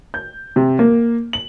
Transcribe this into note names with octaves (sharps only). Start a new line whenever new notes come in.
G6
C3
A#3
F#7